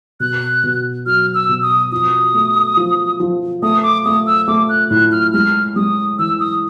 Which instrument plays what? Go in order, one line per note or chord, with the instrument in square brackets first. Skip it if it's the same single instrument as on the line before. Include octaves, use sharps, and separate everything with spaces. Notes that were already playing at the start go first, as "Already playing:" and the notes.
[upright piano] B2 [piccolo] F#6
[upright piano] B2
[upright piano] F#3 [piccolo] F6
[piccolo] E6
[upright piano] B2
[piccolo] D#6
[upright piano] F3 [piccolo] D#6
[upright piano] A3
F3
F3
[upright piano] A3 [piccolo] D#6
[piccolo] D6
[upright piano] A3 [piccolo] D#6
[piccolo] E6
[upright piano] A3 [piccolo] D6
[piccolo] F#6
[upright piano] A2 [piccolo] F#6
[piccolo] F6
[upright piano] G#3 [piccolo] F6
[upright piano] G#3 [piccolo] D#6
[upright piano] E3 [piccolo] E6
[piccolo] D#6